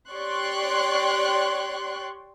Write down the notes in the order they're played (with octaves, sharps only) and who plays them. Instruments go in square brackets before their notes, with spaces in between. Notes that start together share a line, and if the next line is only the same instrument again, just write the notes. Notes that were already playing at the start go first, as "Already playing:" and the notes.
[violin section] G4 C#5 D5 C6 C#6 F#6